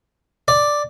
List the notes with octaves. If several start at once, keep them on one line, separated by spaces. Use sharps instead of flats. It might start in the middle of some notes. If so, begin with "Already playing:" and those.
D5